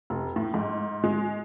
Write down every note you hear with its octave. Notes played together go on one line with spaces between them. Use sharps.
F1
A2
G#2
G#3